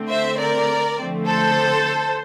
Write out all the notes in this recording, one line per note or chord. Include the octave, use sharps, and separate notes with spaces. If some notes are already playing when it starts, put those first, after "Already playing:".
Already playing: D3 A3 C4
C5 E5
A#4 D5
D3 F3 A3 C4
A4 C5